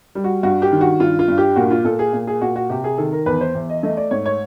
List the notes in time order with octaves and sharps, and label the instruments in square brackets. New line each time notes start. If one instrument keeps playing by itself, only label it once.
[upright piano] G3
F#4
G2 F#4
G4
D#3
F#4
G2 F4
F4
G2
G4
A#2 F#4
F4
A#2 A4
G#4
A#2
G#4
A#2 F#4
F#4
C3 G4
G#4
D#3 A4
A#4
E2 B4
C5
E2
D#5
A3 D#5
D5
G#2 C#5
C#5